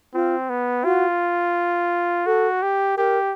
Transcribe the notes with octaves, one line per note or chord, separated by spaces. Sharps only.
C4 F4
B3
F4 F#4
F#4 A4
G4
G4 A#4